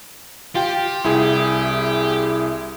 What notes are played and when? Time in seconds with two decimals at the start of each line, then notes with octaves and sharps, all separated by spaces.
0.55 F4 G4 G5
1.04 C2 E4 G#4